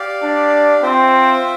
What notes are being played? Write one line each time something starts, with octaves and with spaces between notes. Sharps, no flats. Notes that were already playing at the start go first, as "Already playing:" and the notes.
Already playing: G4 D5 F5
D4
C4 F4 C5 E5 G5